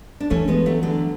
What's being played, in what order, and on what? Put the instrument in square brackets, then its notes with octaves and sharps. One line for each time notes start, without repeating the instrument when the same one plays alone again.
[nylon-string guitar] D4
[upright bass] E3 [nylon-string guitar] A3 C#4
[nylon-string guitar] G#3 B3
F#3 A3
D3 F#3